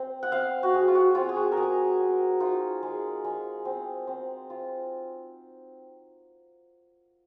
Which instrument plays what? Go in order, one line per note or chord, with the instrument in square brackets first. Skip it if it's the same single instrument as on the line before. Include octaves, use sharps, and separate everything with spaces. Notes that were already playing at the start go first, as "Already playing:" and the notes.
Already playing: [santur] C4
F#5
C4 F5
F#4
G#3 G#4
F4
F#4
C4 F4
G#4
F#4
A#4
G#3 G#4
C4
D#4 F4
G#3
G#3
C4
C4
F4